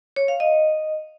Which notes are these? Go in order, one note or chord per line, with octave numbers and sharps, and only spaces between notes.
C#5
F5
D#5